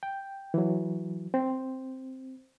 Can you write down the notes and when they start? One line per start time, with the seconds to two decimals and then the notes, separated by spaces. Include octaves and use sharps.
0.03 G5
0.54 E3 F#3
1.34 C4